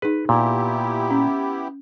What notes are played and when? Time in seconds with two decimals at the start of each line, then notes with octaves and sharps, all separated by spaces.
0.02 D#4 G#4 B4
0.29 A#2 B3 E4 G4
1.11 C#4